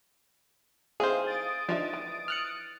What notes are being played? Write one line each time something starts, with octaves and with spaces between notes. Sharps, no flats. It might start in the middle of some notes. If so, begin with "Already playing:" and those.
E3 C4 D#4 G#4 C5 F5
D#6 A6 D7
F3 D4 D#4 E5
E3
F6 F#6 C#7